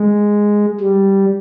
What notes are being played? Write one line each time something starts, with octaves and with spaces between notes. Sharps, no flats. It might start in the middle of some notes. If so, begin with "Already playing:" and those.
Already playing: G#3
G3